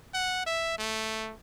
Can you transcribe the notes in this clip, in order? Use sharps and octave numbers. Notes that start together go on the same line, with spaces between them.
F#5
E5
A3